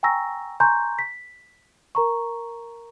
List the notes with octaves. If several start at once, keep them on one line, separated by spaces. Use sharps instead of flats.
G5 G#5 A#5 C#6 E6 A#6
G#5 A#5 C6 C#6 G6
B6
A#4 A#5 C#6